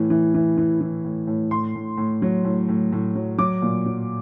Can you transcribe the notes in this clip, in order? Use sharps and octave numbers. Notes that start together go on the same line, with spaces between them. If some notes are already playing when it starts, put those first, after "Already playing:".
Already playing: A2 E3
E3
E3
E3
E3
A2
A2
A2 C6
A2
A2
F#3
A2
A2
A2
F#3
F#3 D6
A#2
F#3